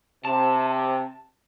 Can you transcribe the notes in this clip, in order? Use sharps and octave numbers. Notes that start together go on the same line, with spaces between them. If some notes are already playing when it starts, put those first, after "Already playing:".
C3 A5